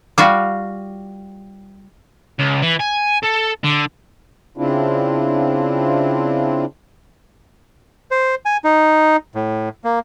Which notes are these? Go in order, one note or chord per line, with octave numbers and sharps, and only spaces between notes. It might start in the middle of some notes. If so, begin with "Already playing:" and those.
G3 F4 F#4
C#2
E3
G#5
A4
D3
C#3 C4 D4 E4 F4
C5
G#5
D#4
A2
A#3